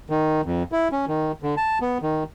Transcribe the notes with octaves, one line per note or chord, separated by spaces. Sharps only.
D#3
F2
E4
C#4
D#3
D3
A5
B3
D#3